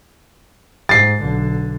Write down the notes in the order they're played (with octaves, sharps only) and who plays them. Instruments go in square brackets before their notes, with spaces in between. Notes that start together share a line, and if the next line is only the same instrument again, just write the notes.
[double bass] G#2 [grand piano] A6 C7
[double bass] B1 D3